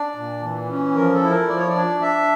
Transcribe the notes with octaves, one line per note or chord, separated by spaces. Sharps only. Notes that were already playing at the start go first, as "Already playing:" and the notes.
Already playing: D4 D5
A#2
E3
C#4
F3 A#4
A4
E4
A#4
F3 D5
C#5
D5
D4
D4 E5